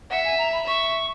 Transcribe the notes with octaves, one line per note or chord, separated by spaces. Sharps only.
E5 F#5
G#5
A#5
B5
E5 C#6